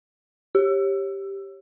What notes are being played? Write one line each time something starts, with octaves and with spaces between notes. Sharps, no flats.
G4